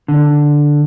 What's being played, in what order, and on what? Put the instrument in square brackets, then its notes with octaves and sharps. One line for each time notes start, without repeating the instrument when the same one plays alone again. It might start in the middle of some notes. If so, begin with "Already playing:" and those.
[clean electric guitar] D3